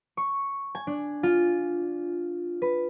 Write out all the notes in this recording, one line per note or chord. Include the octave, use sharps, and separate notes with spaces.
C#6
G#5
D4
F4
B4